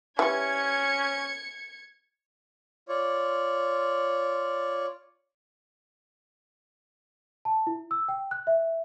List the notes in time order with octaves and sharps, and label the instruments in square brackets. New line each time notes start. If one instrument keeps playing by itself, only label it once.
[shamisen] E3 G3 [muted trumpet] C#4 [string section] G#6 C#7
[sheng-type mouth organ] F4 C#5 D5
[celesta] A5
E4
E6
G5
F#6
E5